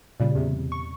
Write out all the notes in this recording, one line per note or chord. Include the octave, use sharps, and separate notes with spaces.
A#2 C#3 G3
E2 C3
C#6